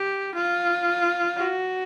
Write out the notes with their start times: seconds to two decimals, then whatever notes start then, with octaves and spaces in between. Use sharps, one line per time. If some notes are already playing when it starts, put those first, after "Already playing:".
Already playing: G4
0.35 F4
1.37 F#4